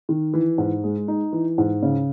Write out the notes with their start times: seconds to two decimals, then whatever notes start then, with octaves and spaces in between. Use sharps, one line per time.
0.09 D#3
0.34 E3
0.58 G#2
0.84 G#3
1.08 D#4
1.33 E3
1.58 G#2
1.83 C#3